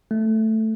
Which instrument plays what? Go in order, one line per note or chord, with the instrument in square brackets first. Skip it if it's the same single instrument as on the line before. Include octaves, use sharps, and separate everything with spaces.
[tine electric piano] A3